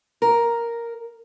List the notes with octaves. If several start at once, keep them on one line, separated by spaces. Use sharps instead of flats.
A#4